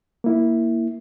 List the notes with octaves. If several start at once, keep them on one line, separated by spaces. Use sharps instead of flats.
A#3 E4